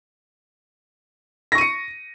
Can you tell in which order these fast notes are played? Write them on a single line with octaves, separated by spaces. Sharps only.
A#6 C#6 D#7 C#7